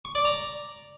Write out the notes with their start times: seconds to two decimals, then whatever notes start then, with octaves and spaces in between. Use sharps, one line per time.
0.05 C#6
0.15 D5
0.25 A#5